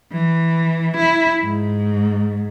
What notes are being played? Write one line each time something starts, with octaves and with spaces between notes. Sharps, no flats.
E3
E4
G#2